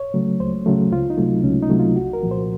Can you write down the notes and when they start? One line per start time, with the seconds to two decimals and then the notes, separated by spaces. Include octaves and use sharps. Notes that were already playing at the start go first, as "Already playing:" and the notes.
Already playing: C#5
0.14 C#3 F#3 A3
0.40 C#2 C5
0.66 C#3 F#3 A3
0.92 C#2 F4
1.10 D#4
1.18 C3 F#3 A3
1.44 C#2 C#4
1.62 D#4
1.70 C3 F#3 A3
1.79 F4
1.96 C2 F#4
2.13 A#4
2.23 A#2 F3
2.31 C5